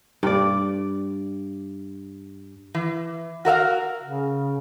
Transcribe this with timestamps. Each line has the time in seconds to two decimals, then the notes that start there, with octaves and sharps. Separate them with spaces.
0.23 G2 D5
2.75 E3
3.45 F#4 A#4 E5 F5
4.04 C#3